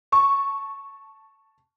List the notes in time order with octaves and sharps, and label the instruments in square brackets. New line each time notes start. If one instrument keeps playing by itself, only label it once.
[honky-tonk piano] A5 C#6